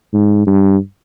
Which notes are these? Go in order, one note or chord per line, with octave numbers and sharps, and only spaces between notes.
G#2
G2